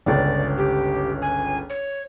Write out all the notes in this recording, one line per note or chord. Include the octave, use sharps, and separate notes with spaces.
G1 C#2 C#3 D5
G4
G#5
C#5